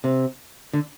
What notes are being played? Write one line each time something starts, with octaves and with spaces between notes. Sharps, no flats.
C3
D3